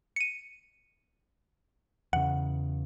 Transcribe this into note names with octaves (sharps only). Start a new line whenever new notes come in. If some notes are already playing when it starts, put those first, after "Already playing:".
C#7 D#7
E2 C#3 F#5